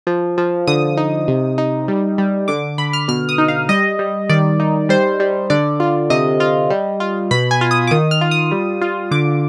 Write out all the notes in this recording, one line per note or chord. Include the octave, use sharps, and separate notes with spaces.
F3
F3
D3 D#6
D#4
C3
D#4
G3
G3
D3 D6
D3 B5
F6
B2 F6
D#6
D#4
F5
G3 D#5
G3
D#3 D5
D#4
G3 C5
G3
D3 D5
F4
C3 D#5
F4
G3
F4
B2 B5
G#5
F4
D#6
D6
D#3 D#6
F6
F4
D#6
G3
F4
D3 D6